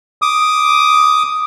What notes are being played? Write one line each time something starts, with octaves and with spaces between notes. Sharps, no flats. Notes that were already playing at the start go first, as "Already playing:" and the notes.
D6 D#6